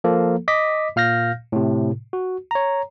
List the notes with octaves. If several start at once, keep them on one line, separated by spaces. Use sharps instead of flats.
F3 A#3 A4
D#5 D6 B6
A#2 F5 F6 G6 A#6
A2 C3
F#4
C#5 A#5